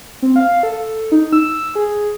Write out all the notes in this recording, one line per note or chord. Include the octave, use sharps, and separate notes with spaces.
C4
F5
A4
D#4
E6
G#4